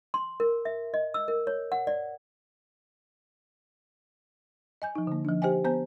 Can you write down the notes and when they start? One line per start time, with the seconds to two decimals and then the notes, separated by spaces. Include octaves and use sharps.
0.14 C6
0.40 A#4
0.65 E5
0.94 D#5
1.14 E6
1.28 A#4
1.47 C#5
1.72 F#5
1.87 D5
4.82 D#5 G#5 G6
4.95 F3 D#4
5.07 D3 A#3
5.25 F3 D4
5.42 G4 C5 D#5 G5 G#5
5.64 B3 C5 G#5 A5 G6